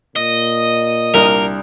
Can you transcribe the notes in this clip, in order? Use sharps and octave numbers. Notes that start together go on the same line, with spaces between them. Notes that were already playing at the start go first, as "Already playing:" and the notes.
A#2 D#5
C2 D4 A#4 F6